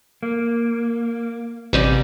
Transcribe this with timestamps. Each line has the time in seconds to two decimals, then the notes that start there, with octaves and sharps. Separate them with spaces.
0.23 A#3
1.73 A1 C3 G3 C4 D#4 D5